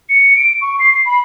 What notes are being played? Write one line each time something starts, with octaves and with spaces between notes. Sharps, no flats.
C#7
D7
C#6
C7
C7
B5